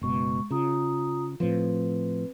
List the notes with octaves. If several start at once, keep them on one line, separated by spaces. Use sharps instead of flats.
F#1 B2 G#3 C#6
C#3 F4 A#5 D#6
A2 F3 C4 B4